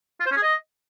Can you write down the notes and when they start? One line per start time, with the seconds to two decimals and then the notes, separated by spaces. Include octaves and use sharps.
0.20 F4
0.26 C5
0.31 C#4
0.37 G#4
0.42 D#5